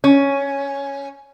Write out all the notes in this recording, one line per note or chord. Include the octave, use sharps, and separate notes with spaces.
C#4